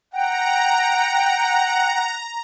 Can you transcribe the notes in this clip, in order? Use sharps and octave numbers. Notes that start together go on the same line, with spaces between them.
F#5 G5 A#5